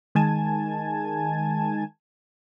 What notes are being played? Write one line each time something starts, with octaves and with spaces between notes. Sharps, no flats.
D#3 G#3 G#5 A5 G#6